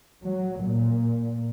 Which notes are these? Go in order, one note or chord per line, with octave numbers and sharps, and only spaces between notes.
F#3
A#2